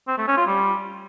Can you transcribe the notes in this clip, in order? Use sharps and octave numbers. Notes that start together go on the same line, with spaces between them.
C4
A3
C#4
F4
G3